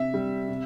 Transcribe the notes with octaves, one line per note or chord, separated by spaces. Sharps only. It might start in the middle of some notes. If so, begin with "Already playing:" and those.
Already playing: C3 E5
G3
C3